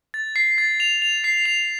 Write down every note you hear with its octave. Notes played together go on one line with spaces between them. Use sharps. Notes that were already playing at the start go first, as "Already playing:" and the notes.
A6
C7
A6
F7
F7
C7
F7